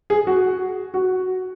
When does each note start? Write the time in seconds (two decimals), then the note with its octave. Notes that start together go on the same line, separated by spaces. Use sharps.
0.10 G#4
0.27 F#4
0.94 F#4